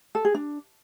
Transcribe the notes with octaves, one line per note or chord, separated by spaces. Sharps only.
A4
G#4
D4